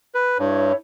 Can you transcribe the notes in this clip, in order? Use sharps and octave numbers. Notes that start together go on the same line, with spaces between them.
B4
G2 E4 C#5